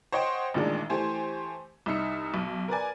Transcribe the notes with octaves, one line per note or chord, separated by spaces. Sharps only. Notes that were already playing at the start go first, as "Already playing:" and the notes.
C5 C#5 D#5 F#5 G5 C6
A1 A#2 D#3 G#3 D4
E3 A3 G4 C5 G#5
C2 D#4 E5 C#7
B1
A#4 B4 D5 G#5